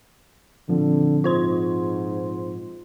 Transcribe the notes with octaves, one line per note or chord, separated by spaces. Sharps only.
A#2 D3 F3 C4
G#2 F4 C5 C6